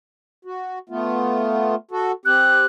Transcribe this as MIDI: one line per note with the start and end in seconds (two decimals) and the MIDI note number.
0.45 0.79 66
0.89 1.75 57
0.89 1.75 59
0.89 1.75 65
1.91 2.12 66
1.91 2.12 69
2.26 2.66 60
2.26 2.66 67
2.26 2.66 90